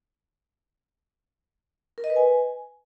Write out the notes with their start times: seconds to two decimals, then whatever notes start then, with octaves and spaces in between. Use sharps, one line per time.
1.98 A#4
2.04 D#5
2.10 B4
2.16 G#5